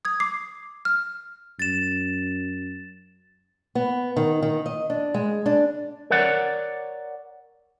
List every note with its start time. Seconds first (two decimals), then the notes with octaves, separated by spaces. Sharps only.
0.05 D#6 G#6
0.20 D6 C7
0.85 F6
1.59 F#2 A6 E7
3.75 B3
4.16 D#3
4.42 D#3
4.66 D#5
4.90 D4
5.14 G#3
5.46 D4
6.10 A#4 C#5 D5 F#5